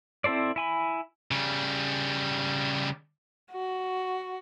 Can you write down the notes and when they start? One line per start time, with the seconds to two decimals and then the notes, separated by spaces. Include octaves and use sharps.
0.24 C4 E4 A4 C5 D5
0.56 E4 G#5 B5
1.31 C#3 G3
3.52 F#4